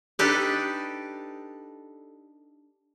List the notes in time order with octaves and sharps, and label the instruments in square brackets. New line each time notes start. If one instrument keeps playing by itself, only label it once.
[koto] D4 D#4 G4 A4 B4 D5